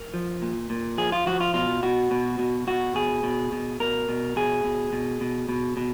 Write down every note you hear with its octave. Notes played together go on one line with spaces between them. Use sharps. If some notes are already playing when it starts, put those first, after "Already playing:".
Already playing: A#4
F3
A#2
A#2
F3 G#4
F4
F3 F#4
F4
B2 F4
B2 F#4
B2
B2
B2 F#4
B2 G#4
B2
B2
B2 A#4
B2
B2 G#4
B2
B2
B2
B2
B2